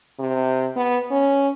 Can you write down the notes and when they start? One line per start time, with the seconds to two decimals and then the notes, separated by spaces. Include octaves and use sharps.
0.19 C3
0.76 B3
1.11 C#4